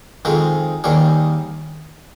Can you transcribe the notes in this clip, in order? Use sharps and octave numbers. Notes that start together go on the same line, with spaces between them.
F2 D#3 G#3 C4 G#4
D#2 D#3 G3 G#4